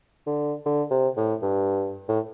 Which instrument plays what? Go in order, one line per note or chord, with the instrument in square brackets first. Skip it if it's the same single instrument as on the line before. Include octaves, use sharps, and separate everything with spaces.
[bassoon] D3
D3
C3
A2
G2
A2